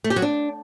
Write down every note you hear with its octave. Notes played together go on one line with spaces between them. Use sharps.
A3
G4
F#3
D4